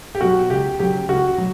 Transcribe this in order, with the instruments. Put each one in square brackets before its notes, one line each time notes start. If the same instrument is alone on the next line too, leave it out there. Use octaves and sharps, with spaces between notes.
[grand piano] G4
B2 F#3 F#4
C#2 G4
C#3 F#3 G4
C#2 F#4
F#3